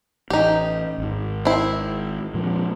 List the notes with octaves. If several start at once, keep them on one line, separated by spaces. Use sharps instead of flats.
A1 D#4 G4
G#1 G#2
C4 E4
A#2 F3 G#3